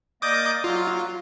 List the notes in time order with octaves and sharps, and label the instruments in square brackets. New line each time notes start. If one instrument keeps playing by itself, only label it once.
[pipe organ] A#3 D5 D#5 [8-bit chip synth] D6 D#6 G6
[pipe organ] F#3 [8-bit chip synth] F4